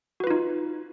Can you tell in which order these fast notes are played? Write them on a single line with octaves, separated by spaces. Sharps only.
F#4 B4 F4 D#4